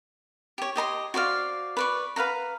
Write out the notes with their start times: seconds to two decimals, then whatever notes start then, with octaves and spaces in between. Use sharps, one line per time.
0.58 G4 C#5
0.76 G4 D#5 A#5 C6
1.14 F#4 C5 D5 F5
1.77 B4 D5 C#6
2.16 B4 F5 F#5 A#5